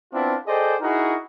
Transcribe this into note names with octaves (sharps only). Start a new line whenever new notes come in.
B3 C4 D4 E4 F4
G#4 A4 C5 D5 D#5 G5
D#4 E4 F#4 G#4 A#4 D#5